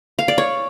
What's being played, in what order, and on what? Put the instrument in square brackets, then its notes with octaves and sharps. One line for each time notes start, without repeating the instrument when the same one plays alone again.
[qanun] F5
D5
C#5